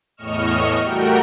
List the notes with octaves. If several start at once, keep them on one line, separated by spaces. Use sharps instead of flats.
E2 A2 D#5 C#6 F6 E7
G3 A3 F#4 A#4 G5